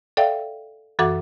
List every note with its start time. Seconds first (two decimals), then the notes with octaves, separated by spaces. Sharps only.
0.17 A4 D5 E5 F5 G5
0.99 F#2 E3 F#4 A4 F#5 D6